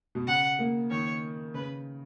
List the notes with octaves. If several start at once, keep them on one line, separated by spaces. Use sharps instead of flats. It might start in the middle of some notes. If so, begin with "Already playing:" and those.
B2
C#3 F#5
A#3
D#3 C#5
C#3 B4